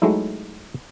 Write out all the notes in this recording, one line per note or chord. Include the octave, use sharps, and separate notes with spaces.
F#3 G#3 A3 D#4 E4